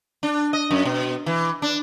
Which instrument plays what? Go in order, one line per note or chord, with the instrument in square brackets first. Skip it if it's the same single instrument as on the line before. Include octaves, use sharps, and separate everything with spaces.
[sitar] D4
D#5
F#2
B2
E3
D4